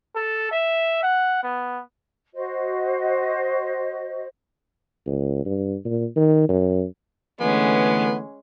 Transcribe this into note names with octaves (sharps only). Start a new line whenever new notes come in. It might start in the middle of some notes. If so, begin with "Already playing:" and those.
A4
E5
F#5
B3
F#4 C5 D#5
C#2
G2
A#2
D#3
F#2
D3 E3 G#3 A3 B3 C#4